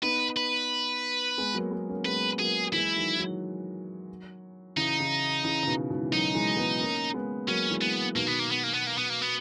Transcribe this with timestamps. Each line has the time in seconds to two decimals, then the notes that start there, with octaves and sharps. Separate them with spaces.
0.02 B3 D#4 B4
0.37 B4
1.38 G#3 B3
1.54 F#3 A#3
1.71 G#3 B3
1.89 A#3 C#4
2.05 G#3 B3 B4
2.39 F#3 A#3 G#4
2.73 E3 G#3 E4
2.96 D#3 F#3
3.18 D#3 F#3
4.76 C#3 E3 D#4
4.99 C#3 E3
5.44 C#3 E3
5.63 C#3
5.66 B2 D#3
5.90 G#2 B2
6.02 E3
6.12 D#3 F#3 D#4
6.35 E3 G#3
6.57 G#3 B3
6.79 A#3 C#4
7.14 G#3 B3
7.47 F#3 A#3 C#4
7.71 E3 G#3
7.81 B3
8.15 B2 D#3 A#3
8.27 B3
8.39 A#3
8.51 B3
8.63 A#3
8.74 B3
8.87 A#3
8.98 B3
9.10 A#3
9.22 B3